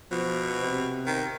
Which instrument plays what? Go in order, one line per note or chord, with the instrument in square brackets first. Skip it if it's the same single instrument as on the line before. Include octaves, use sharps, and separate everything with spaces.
[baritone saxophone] B2 [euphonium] F3
[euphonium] C3
[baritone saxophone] D#3